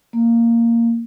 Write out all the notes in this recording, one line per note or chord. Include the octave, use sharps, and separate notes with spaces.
A#3